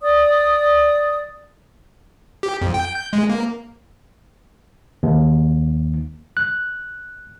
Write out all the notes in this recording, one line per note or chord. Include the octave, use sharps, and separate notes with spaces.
D5 D#6
G4
F2
G5
G6
G#3
A#3
D#2
F#6